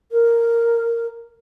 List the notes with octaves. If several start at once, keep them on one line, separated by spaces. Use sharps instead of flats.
A#4